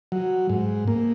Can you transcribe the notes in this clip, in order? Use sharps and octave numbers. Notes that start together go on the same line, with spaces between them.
F#3
G#2
A#3